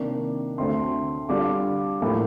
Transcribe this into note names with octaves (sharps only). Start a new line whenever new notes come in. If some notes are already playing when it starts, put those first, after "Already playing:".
Already playing: C3 D#3 A#3 D4 D6
D2 D3 A3 C4 C6
D3 G3 D4 F4 D6
A2 F3 A#3